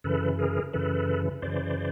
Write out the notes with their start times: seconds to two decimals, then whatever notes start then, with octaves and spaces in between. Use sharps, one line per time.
0.04 F#2 C#3 E3 A4 B4
0.39 G#4 A#4
0.73 F#2 C#3 E3 A4 B4
1.42 F#2 C#3 E3 C5 D5